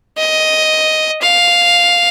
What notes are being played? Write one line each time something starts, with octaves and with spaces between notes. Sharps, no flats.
D#5
F5